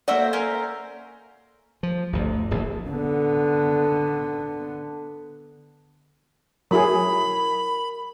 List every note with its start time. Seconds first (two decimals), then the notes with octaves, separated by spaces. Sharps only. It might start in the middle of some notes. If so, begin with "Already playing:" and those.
0.08 A#3 F#4 A4 C5 D5 E5
0.33 C#4 A#4 C5
1.83 F3
2.13 G1 D2
2.51 D1 A#1 E2
2.90 D3 B3
6.71 F#3 E4 G#4 A#4 B5